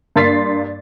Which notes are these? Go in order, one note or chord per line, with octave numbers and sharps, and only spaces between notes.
G2 A#3 C6 A6 B6 C7